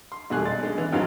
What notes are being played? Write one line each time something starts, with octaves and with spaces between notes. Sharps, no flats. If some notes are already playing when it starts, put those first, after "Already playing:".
C6
E1 B2 G3 A3 G#4 F#6
B1 C6 A6
G#3 C#4
D3 E3
F2 G#2 F#3 F5